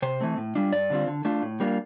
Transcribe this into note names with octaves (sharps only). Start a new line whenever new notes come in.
C3 C5
E3 A3 C4
A2
G3 D4 F4
G2 D5
D3 G3 C4 F4
D3
A3 D4 F4
A2
G3 A#3 D4 F4